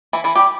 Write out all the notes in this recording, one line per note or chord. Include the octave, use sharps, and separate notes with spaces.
E3 E4
E3 E4
G3 G4